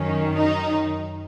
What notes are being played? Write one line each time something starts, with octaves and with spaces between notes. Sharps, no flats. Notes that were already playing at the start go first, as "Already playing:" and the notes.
Already playing: F#2 D#3 C#4
D#4